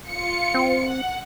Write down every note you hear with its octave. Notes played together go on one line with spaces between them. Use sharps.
F4 C#7
C4
F#5